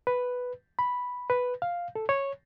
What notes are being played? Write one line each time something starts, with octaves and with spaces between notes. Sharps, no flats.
B4
B5
B4
F5
A4
C#5